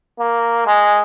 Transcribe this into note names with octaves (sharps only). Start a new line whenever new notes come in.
A#3
G#3